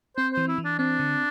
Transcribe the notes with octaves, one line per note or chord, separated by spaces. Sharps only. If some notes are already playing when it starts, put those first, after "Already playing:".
C4 C5
E3 C5
E4
E3
D4
C4 D4
D3